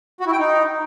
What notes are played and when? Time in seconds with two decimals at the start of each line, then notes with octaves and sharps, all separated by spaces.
0.20 F#4
0.26 E4
0.33 G5
0.39 D#4